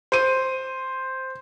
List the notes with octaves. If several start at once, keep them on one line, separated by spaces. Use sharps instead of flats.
C5 D#7